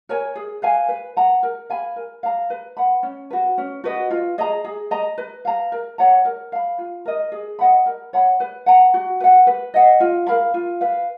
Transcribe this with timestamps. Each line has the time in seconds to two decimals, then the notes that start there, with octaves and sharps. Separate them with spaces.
0.09 A#4 C#5 G#5
0.35 G#4
0.62 B4 F5 G#5
0.88 B4
1.16 F#5 A#5
1.43 A#4
1.70 F5 G#5 B5
1.96 A#4
2.23 F5 A#5
2.50 B4
2.77 F#5 B5
3.03 C#4
3.30 F#4 B4
3.58 C#4
3.84 F#4 B4 D#5
4.11 F4
4.38 G#4 D#5 A#5
4.65 G#4
4.91 D#5 A#5
5.18 B4
5.45 F5 A#5
5.72 A#4
5.98 C#5 F#5 A#5
6.25 A#4
6.52 F5 B5
6.78 F4
7.05 A#4 D#5
7.32 G#4
7.59 D#5 F#5 B5
7.86 A#4
8.13 C#5 F#5 B5
8.40 B4
8.66 F#5 A#5
8.94 F#4
9.20 B4 F#5
9.47 B4
9.74 D#5 F#5
10.00 F4
10.27 A#4 F5 B5
10.54 F4
10.81 B4 F5